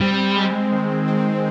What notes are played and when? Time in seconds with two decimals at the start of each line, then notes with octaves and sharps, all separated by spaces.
0.01 G3 C4
0.36 G#3
0.72 D#3
1.08 C4